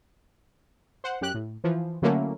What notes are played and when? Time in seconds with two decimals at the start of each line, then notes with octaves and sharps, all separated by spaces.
1.04 C5 F#5
1.21 F#2 G4 F#6
1.34 A2
1.64 E3 F3
2.02 D3 F#3 A3 A#3 C#4 E4